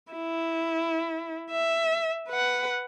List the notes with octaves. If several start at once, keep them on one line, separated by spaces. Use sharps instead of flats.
E4
E5
B4 F#5